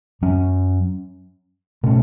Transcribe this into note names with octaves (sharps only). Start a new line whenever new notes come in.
F#2 F#3 C#4
B2 A3 C#4